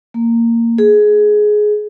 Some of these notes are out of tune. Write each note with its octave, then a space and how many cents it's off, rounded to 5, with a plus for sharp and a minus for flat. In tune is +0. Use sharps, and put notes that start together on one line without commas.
A#3 -15
G#4 +15